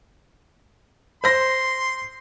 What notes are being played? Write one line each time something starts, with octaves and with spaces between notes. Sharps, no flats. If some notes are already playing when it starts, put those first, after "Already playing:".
C5 C6 A#6